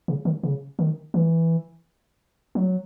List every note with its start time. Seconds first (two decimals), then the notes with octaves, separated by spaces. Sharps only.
0.08 C#3
0.25 D#3
0.43 C#3
0.79 D#3
1.14 E3
2.55 F#3